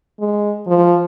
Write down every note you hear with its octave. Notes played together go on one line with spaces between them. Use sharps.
G#3
F3